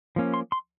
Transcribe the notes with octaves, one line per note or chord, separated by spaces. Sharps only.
F3 A#3 C#4
C6
C6